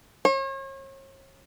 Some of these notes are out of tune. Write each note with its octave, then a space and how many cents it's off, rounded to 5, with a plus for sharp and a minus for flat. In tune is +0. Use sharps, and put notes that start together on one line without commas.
C#5 -40